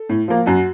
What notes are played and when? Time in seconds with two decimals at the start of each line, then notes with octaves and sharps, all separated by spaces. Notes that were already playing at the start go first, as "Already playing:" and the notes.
Already playing: A4
0.09 A2
0.28 F3 A#3
0.46 F#2 F#4